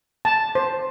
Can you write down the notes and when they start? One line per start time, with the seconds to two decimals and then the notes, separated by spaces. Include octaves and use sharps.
0.25 A5
0.55 C5